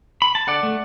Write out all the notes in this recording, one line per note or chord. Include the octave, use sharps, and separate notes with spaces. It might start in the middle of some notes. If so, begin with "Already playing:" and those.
B5
A5
D3 D5 F#5
A3